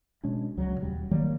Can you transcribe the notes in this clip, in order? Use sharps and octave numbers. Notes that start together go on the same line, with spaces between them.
B2 G#3 C#4 D4
C#2 C#3 F#3
D#1 G3
D#3 F#3 G3 A#3